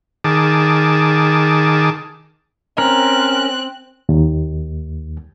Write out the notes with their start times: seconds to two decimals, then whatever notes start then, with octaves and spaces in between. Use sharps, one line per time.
0.24 D#3 G#4 A5 D6
2.78 C4 C#4 A#4 F#6
4.09 D#2